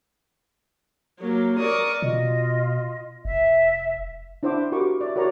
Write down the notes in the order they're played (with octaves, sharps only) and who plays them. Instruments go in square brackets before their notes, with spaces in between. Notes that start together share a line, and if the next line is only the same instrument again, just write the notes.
[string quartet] F#3 A#3
A#4 D5 C#6 D#6
[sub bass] B2 [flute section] F4 D#5
[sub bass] F1 [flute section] E5
[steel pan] D4 E4 C5 E5 F#5 D6
F#4 G4 A#4 C#6 D6
D5 E5
F#4 A#4 C#5 D5 A#5 C#6